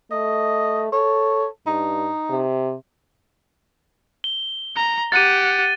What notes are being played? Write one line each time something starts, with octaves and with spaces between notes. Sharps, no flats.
A3 D#5
A4 C#5
G2 D#4
C3
G7
A#5
G4 F#5 A6 D#7